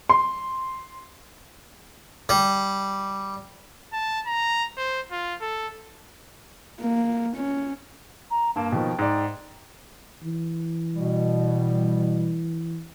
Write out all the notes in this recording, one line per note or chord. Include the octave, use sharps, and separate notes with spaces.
C6
G3
A5
A#5
C5
F4
A4
A#3
C#4
A#5
G2 A#3 A5
B2 D#3 F3 G5
G#2 D5
E3
B2 G3